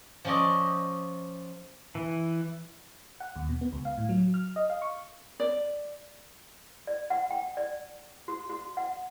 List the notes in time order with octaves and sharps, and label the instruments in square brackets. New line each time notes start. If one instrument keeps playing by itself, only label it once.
[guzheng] F3 C#4 F4 D5 D#5
[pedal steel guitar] E3
[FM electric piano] F#5
D#2
B2
B3
C#2
F5
A2
F#3
F6
D#5
F5
C#6
[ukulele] D5
[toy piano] D5
F#5
G5
D5
F#4
F#4
F#5